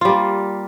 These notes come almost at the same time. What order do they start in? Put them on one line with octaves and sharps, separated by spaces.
F4 G3 A#3